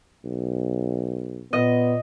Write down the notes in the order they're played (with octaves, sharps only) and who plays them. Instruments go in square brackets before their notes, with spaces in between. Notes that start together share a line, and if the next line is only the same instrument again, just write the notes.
[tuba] B1
[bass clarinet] A#2 [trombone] B3 [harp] D#5